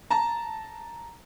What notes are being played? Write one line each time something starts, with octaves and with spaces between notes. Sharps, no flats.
A5 A#5